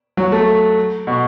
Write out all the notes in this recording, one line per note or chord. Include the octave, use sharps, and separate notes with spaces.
F#3
A3
B2